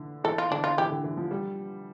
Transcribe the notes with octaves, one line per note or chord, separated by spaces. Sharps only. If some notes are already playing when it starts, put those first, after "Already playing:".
Already playing: D3 E3
E3 A4
F4
D3 D4
F4
E3 G4
D3
E3
F3
G3